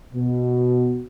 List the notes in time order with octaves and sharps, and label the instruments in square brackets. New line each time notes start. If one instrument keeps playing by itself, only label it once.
[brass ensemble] B2